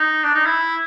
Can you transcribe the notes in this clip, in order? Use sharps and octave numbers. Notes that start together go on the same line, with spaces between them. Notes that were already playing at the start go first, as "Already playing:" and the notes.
Already playing: D#4
D4
D#4
E4